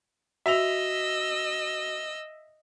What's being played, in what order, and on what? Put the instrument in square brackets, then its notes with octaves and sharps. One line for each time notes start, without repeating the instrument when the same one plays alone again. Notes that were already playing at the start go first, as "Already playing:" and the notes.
[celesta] F#4 [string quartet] D#5 E6 [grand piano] E5 F7